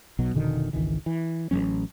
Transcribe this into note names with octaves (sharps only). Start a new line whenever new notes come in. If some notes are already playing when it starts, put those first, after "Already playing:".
B1 B2 F#3
F1 B2 D3 D#3
G#1 C#2 D#3 E3
E3
A1 F3 F#3 C#4